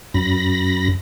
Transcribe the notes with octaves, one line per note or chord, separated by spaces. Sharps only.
F#2 B5 A#6